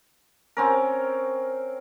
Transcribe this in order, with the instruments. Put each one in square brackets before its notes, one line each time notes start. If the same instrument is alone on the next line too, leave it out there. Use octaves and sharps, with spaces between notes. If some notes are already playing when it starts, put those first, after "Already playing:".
[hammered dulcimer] C4 C#4 A#4